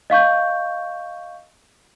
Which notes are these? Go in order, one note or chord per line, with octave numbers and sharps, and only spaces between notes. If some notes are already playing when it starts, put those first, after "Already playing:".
D#5 F5 C#6 G6